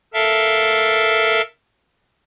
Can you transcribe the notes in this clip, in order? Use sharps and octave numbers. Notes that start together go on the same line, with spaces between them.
A4 A#4 E5 F5 A5